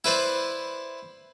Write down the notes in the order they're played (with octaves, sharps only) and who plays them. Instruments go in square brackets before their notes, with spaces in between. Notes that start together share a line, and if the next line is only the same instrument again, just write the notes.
[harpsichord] E4 B4 C5 D5